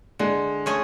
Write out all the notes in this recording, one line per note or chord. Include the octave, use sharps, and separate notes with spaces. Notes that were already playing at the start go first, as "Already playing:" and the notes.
D3 G#3
A3 C#4 G#4